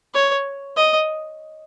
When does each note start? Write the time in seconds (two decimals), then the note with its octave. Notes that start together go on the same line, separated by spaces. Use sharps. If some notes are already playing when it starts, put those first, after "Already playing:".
0.14 C#5
0.77 D#5